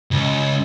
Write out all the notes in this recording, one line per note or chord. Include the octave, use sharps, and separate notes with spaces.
C#2